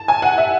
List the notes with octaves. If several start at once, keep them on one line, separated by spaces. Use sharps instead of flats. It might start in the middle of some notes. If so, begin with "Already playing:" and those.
Already playing: A5
G#5
F#5
E5